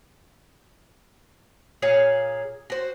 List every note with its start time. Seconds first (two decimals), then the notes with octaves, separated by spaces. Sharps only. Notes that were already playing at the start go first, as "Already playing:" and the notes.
1.82 A#2 G#4 C#5 F5
2.70 F#4 C5